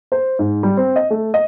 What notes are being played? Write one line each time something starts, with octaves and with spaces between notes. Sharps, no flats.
C5
G#2
G3
C4
D#5
A3
D#5